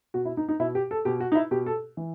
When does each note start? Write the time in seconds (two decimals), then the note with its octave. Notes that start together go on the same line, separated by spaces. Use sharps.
0.14 B2 F#4
0.25 E4
0.37 D#4
0.49 D#4
0.60 B2 E4
0.75 G4
0.91 A4
1.05 B2 G4
1.20 F#4
1.32 D#4
1.35 E4
1.51 B2 G4
1.66 A4
1.97 E3